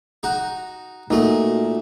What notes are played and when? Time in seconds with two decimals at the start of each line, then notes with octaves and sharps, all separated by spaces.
0.23 D#4 F#4
1.10 A#2 A3 D#4 F#4 D#5